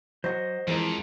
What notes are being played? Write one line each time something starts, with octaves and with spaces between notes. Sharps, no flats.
F#3 F#4 C5 D#5
F2 E3 F3 G#3 A#4